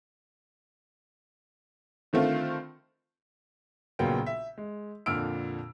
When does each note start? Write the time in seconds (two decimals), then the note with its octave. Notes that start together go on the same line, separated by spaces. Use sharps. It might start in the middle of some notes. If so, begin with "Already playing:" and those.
2.13 D3 D#3 A3 C4 F4
3.99 A#1 C#3 F#3 A#3 B3 G5
4.26 E5
4.58 G#3
5.06 F2 A#2 D3 E6 F6 D7